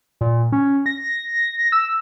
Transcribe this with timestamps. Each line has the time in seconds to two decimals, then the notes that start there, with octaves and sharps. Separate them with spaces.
0.21 A#2
0.52 C#4
0.86 A#6
1.72 E6